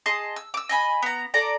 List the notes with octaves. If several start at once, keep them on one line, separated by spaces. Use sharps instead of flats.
G#4 D#5 A5 C6
E6
D6 E6
D#5 G#5 B5
B3 A#5
A4 D5 A#5